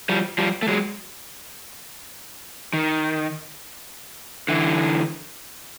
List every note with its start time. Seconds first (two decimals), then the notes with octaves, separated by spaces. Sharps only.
0.09 F3 G3
0.38 F3 G3
0.63 A3
0.68 F#3 G#3
2.73 D#3
4.48 D3 E3